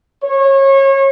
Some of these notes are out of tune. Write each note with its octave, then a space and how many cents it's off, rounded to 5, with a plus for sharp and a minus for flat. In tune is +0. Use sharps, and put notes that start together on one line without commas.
C#5 -30